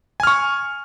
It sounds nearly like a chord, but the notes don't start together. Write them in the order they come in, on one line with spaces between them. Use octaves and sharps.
G#5 F6 C#6